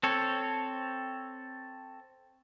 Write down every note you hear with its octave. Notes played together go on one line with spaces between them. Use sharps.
C4 A4 C#5